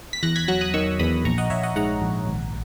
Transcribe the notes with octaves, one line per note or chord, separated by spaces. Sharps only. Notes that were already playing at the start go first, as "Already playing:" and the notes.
B6
E2 F#6 A#6
G#6 B6
F#3 F#6 A#6
D#6 F#6
D#3 C#6 E6
E2 B5 D#6
A#1 A#5 C#6
D#5 F#5
A#1 C#5 E5
D#5 F#5
G#2 F#5 A#5
A#1
G#1